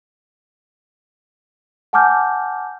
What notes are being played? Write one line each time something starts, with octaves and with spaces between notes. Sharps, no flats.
F#5 G#5 A5 D6 F6 G6